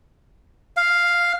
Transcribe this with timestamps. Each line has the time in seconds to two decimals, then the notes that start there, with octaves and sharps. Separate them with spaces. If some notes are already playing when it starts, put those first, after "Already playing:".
0.77 F5